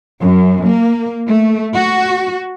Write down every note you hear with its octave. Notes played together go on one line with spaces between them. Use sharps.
F#2
A#3
A3
F#4